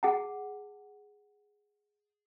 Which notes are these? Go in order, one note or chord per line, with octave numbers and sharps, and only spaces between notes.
G#4 F#5 A5